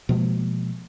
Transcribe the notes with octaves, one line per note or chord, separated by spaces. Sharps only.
B2 F3 G#3 A#3